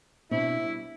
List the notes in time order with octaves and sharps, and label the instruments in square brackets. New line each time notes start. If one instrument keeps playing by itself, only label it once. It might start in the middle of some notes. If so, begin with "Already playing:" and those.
[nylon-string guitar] B2 C4 D4 [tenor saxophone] E4
[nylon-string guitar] G3